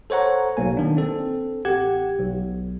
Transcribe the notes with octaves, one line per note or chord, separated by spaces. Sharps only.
A4 C5 C#5 F#5 A#5
B1 A#3 G#5
D#3 A#3 D4
C4 A4
A1 G4 F#5 G#6
B1